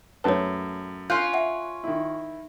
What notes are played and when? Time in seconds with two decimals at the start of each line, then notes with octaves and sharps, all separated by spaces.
0.24 F#2 A3 B4 C#5 A5
1.10 C#4 F4 C6 F#6 G6
1.33 E5 F#5
1.84 D#3 E4